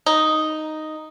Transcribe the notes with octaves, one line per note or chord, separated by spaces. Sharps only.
D#4